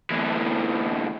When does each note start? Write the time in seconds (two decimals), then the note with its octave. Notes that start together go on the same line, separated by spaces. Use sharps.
0.10 D2 E3